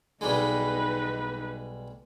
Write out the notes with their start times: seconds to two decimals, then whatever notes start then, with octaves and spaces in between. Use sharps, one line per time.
0.21 B1 G3 G#3 D#4 B4